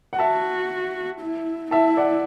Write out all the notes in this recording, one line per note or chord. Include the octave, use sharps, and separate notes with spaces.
F#5
F#4 E5 A5
E4
E4 E5 A5
D5 F#5